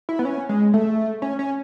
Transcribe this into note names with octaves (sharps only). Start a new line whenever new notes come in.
E4
B3
C#4
G#3
A3
C#4
C#4